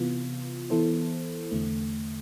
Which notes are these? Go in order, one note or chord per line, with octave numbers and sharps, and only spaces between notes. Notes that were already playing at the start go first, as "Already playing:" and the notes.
Already playing: C3 E3 B3 F4
E3 B3 E4 A4 C5
E2 D3 A3